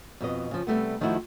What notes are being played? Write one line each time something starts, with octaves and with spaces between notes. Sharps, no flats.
F2 B2 D#5
C#3 F3
C3 G3 A3 B3
D#3 F3 A3 D#4 E4 F#4